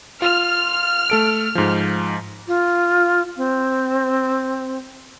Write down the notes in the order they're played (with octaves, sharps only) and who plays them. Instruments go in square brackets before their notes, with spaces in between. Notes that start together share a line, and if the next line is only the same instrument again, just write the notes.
[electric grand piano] F4 [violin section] F6
[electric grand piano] A3 A4 D7
G#2 F3
[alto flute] F4
C4